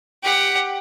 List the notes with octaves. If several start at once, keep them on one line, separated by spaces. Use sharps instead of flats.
G4 F#5